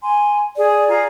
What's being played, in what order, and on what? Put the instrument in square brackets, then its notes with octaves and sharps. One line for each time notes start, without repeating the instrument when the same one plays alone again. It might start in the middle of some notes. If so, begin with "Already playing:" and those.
[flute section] G#5 C6
[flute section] G#4 [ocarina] D5
[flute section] F4 G#4 A#5